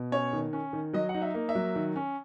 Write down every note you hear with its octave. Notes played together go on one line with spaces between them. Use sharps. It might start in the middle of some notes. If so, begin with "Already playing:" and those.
Already playing: B2
C#4 C#5
D#3
C#4
D#3
F#3 D#5
F#5
D#4
E5
A#3
E5
F#3
D#3
C#4